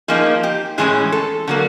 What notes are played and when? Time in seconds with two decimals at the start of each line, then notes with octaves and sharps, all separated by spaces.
0.08 F3 A#3 D#4 G#4
0.43 G4
0.78 A2 E3 G#3 C#4 G#4
1.12 A4
1.47 D3 F#3 A#3